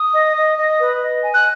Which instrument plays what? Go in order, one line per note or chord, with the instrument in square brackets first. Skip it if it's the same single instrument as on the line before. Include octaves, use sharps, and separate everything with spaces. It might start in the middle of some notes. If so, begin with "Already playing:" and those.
Already playing: [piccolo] D#6
[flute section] D#5
D#5
D#5
B4
D#5
G#5
[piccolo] F#6